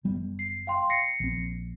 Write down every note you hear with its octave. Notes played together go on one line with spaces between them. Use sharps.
F#1 G3 B3
C7
F5 G5 C6
A#6 C7 C#7
A#1 C4